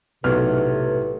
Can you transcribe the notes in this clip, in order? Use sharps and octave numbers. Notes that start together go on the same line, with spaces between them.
B1 A2 C3 B4 F6